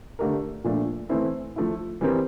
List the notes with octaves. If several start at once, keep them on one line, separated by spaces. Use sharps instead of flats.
D3 A3 D4 G4 A#4
A#2 F3 A3 D4
E3 A3 C4 E4
F3 A3 E4
E3 G3 C4 G4 A#4